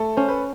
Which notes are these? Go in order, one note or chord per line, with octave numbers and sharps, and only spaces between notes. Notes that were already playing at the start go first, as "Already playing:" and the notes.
Already playing: A3 A4
C#4 C5
B4